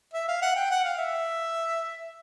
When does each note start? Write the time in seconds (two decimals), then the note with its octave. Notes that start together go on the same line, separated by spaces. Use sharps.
0.14 E5
0.28 F5
0.42 F#5
0.56 G5
0.71 F#5
0.84 F5
0.98 E5